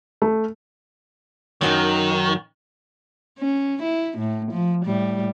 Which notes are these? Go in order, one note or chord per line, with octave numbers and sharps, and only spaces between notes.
A3
F#2 D#3 F#3 D#4
C#4
E4
A2
F3
A2 G3